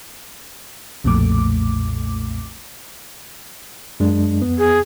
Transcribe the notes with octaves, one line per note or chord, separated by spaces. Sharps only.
B1 F2 A#2 A3 D6
F#2 G#3 D4
F2 B3
G#4